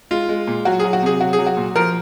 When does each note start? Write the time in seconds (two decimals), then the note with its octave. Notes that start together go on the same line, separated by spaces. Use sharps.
0.11 G#3 F4
0.29 G#3
0.47 A#2
0.65 F#3 F#4
0.79 F#3 G#4
0.93 F#4
1.02 C3 G#4
1.20 F#3 F#4
1.33 G#4
1.39 F#3
1.47 F#4
1.57 A#2
1.76 F3 A#4